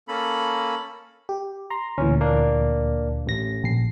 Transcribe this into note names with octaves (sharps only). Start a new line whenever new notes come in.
A#3 C#4 A4 B5
G4
A#5 C6
D2 A#2 E3 C#4
A#3 D4
A1 A#6
A#1 C7